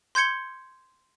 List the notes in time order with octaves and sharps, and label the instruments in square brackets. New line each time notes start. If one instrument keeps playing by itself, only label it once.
[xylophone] C6 G6 G#6 C#7 G7